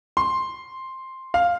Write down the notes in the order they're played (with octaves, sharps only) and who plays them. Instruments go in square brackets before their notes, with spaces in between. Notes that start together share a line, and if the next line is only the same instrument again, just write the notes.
[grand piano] C6
F5